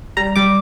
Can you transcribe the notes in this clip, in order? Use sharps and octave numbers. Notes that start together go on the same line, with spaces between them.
G3 A#5
G3 D6